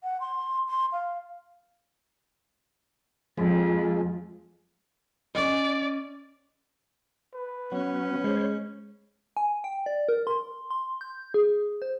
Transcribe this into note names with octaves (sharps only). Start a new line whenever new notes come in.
F#5
C6
C6
F5
F2 F3 G#3
C#4 D5 D#5
B4
F#3 B3 C#4
G#3 C5 C#5
G#5
G5
D5
A#4
C6
C6
G6
G#4
C5